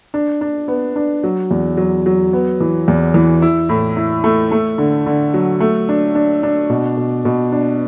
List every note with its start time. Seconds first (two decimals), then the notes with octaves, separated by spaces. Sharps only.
0.14 D4
0.41 D4
0.68 B3
0.96 D4
1.24 F#3
1.51 E2
1.77 F#3
2.06 F#3
2.33 B3
2.60 E3
2.88 E2
3.14 E3
3.42 E4
3.69 A2
3.97 E4
4.24 A3
4.52 A3
4.78 D3
5.06 D3
5.34 F#3
5.60 A3
5.89 D4
6.15 D4
6.43 D4
6.70 B2
6.97 B2
7.25 B2
7.52 D4